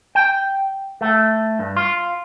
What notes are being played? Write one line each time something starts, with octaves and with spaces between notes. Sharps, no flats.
G5
A3
G2
F4